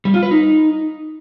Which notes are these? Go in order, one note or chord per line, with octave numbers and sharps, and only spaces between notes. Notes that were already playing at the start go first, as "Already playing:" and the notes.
G3
F4
B4
D#4